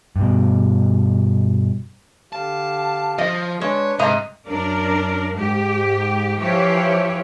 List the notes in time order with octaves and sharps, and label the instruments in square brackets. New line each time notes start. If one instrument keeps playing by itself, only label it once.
[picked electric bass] G2 B2
[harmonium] D3 G4 F5 [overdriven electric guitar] A5
[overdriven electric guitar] F3 [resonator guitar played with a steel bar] D#5
[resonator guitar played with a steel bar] G#3 [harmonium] D4 B4 [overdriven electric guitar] C#5
[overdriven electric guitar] G#2 [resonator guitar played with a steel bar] C3 D#5 A#5
[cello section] F#2 D4 A#4 D5
G#2 G4
E3 F3 G4 C#5 E5